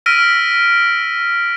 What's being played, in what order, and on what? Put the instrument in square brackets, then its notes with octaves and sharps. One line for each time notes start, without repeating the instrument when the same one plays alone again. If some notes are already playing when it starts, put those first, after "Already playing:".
[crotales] E6 F6 A#6 B6 D7 D#7